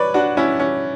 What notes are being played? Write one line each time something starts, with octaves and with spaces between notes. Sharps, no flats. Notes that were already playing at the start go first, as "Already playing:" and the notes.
Already playing: B4 C#5 D5
D4 F#4
C#4 E4
C#4